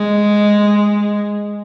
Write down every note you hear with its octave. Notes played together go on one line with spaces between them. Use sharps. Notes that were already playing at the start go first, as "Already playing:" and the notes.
Already playing: G#3